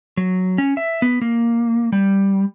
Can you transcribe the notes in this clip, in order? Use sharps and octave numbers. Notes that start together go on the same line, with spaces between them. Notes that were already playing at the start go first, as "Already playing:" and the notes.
F#3
C#4
E5
B3
A#3
G3